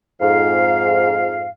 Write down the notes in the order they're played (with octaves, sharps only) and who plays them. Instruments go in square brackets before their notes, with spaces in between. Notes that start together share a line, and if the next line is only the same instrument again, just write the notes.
[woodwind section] F2 G#2 F5